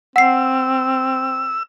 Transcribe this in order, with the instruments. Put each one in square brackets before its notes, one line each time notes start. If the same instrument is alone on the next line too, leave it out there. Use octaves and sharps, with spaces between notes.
[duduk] C4 [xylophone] F#5 C7 [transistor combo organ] E6